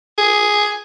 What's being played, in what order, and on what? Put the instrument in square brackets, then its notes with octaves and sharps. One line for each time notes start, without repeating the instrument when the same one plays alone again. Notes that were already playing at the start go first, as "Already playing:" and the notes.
[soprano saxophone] G#4